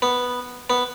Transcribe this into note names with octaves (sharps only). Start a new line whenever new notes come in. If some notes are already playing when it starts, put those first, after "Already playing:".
B3
B3